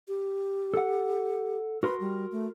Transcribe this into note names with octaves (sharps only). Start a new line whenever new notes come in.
G4
A4 F#5
F#4 A#4 B4 C6
G3
A3